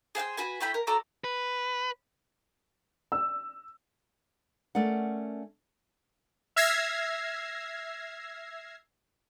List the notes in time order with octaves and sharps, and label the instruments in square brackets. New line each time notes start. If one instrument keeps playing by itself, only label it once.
[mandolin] G#4 C5 F#5 G5
F#4 B4 G#5
A3 E4 G5 B5
A#4
F#4 A4 D5 A#5
[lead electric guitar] B4
[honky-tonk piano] E6
[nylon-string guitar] A3 C#4 A#4 D5 F#5
[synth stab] E5 E6 F6 G#6 A#6 C7